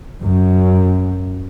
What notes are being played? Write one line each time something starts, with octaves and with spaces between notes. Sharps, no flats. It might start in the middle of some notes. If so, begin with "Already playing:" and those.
F#2